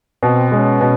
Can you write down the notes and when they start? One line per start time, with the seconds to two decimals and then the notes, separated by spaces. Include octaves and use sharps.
0.23 B2 C4
0.52 G#3 C#4
0.81 B2